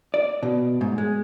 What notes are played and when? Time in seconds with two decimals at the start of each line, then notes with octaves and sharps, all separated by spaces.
0.14 D5
0.43 B2
0.81 G#2
0.98 G#3